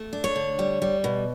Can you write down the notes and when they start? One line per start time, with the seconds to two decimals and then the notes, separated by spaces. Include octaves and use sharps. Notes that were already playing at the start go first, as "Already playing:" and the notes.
Already playing: A3
0.13 D4
0.24 C#5
0.36 D3
0.59 G3
0.82 G3
1.04 B2